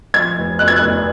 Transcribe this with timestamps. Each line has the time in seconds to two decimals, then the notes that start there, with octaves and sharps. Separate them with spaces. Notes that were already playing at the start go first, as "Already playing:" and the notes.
0.14 F3 G#6
0.37 F1
0.59 F2 F#6
0.68 G#6
0.76 F#6
0.83 F1